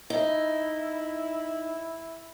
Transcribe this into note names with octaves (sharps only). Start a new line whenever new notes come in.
D#4 E4